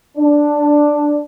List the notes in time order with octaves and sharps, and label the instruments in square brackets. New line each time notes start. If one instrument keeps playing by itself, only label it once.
[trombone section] D4